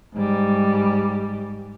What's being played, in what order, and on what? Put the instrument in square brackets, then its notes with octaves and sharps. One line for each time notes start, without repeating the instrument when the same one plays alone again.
[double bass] G#2 G3